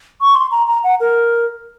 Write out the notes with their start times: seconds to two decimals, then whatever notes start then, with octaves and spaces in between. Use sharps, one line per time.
0.21 C#6
0.35 C6
0.51 A#5
0.68 A#5
0.84 F#5
1.00 A#4